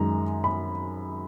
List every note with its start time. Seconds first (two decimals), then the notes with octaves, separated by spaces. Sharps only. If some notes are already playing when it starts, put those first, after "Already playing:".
Already playing: F#2 D#3 G#3 A#5
0.44 B5